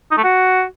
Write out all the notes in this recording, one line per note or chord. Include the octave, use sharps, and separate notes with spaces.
D#4
A3
F#4